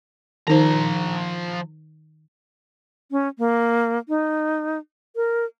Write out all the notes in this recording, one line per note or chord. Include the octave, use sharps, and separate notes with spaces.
D#3 F3 D#4 C5 A#5
C#4
A#3
D#4
A#4